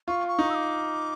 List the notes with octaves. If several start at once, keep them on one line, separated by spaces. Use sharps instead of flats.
F4 C#6
C#6
D#4
E6
D6